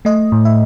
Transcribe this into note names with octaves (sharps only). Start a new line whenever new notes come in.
A3 D#5
A2
E5